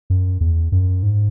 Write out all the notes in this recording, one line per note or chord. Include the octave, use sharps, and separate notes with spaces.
F#2
E2
F#2
G#2